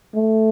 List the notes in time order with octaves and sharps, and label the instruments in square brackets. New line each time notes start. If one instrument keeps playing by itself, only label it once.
[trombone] A3